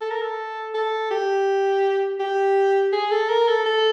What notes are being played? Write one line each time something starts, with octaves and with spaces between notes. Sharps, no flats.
A4
A#4
A4
A4
G4
G4
G#4
A4
A#4
A4
A4